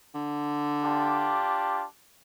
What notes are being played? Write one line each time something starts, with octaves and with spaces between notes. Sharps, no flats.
D3
D4 F4 G4